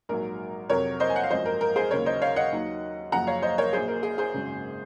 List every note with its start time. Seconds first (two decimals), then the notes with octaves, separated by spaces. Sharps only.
0.09 A#1 G#2 F#3 A#4
0.70 F2 C3 F#3 A#4 C#5
1.00 C5 D#5
1.10 G#5
1.16 F#5
1.23 F5
1.30 G#1 F#2 F3 C5 D#5
1.46 A#4
1.61 A#4
1.76 G#4 C5
1.91 D#2 C#3 F#3 A#4 C#5
2.06 C5 D#5
2.22 C#5 F5
2.36 D#5 F#5
2.52 D#2 D#3 F#3
3.12 F#1 F#2 F3 F#5 A#5
3.27 C#5 F5
3.42 C5 D#5
3.58 A#4 C#5
3.73 A#1 A#2 F#3 G#4 C5
3.88 A#4
4.03 G#4
4.18 G#4 C5
4.34 G#1 F#2 C#3